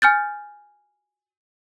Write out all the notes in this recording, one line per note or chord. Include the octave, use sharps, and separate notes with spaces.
G#5 F6 G6 A6